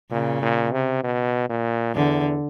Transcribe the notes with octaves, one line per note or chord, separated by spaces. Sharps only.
A#2 C#3
A#2
C3
B2
A#2
E2 D3